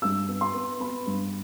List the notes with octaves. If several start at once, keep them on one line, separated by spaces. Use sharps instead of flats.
G2 E6
B3
C6
B3
B3 B5
G2